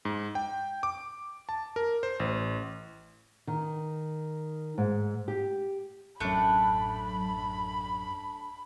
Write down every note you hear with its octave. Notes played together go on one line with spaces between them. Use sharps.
G#2
G5
D6
A5
A#4
C5
A1
D#3
G#2
G4
A1 F#2 A3 D4 B5 F#6